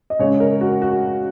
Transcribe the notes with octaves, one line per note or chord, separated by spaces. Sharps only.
D#5
C#3 G#3 C#5
A#4
F#4
F#4